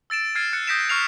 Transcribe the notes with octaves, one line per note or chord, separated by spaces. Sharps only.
E6 A6 D7 E7
F6 G#6 A6 C7 D#7
F#6 C#7
D#6 G6 A#6 B6 D7 E7
C#6 F6 C7 F7